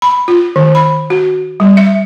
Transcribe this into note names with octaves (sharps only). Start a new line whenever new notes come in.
B5
F4
D#3
B5
F#4
G3
E5